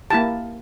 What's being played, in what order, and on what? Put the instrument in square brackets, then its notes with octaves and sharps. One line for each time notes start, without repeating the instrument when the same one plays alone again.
[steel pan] A#3 E4 G4 A5